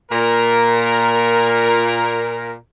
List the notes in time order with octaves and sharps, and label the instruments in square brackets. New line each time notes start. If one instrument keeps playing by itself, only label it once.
[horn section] A#2 A#4